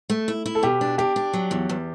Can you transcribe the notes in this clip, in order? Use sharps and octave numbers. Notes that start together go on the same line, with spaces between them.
A3
E4
E4
A4
B2 G4
D4
D4 G4
D4
F#3
E2
E2